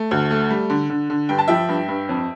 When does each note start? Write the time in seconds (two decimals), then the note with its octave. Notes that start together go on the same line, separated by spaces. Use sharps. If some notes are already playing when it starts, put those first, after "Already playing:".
Already playing: A3
0.11 D2
0.31 A3
0.51 G3
0.70 D3
0.90 D3
1.10 D3
1.29 G2 G5
1.38 A5
1.48 F3 E5 G5
1.69 G2
1.88 G2
2.09 F2